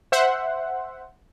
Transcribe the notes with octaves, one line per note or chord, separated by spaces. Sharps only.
C5 E5 F#5